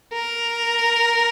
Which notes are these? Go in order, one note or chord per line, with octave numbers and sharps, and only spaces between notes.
A#4